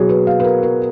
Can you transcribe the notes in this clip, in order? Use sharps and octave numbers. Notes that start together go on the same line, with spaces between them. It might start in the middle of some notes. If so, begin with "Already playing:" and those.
Already playing: B2 F#3 B3 F#4 G#4
B4
F5
B4
A#4
A#4